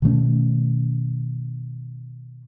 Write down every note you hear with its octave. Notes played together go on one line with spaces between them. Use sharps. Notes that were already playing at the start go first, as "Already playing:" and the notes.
B2 D#3 A3 C#4